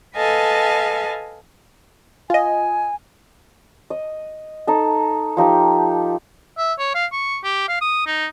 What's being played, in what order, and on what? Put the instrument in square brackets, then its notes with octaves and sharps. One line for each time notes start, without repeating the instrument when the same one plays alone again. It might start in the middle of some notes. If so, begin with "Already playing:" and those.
[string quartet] A4 B4 D#5 F5 G#5 A5
[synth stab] F4 D#5 [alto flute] G#5
[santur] D#5
D#4 A4
F3 D#4 G4 G5
[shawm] E5
C#5
F5
C#6
G4
F5
D#6
D#4